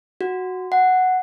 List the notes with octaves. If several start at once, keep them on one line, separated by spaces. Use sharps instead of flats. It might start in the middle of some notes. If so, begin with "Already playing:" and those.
F#4
F#5